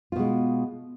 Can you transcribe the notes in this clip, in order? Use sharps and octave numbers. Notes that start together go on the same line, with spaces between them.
B2 G#3 F4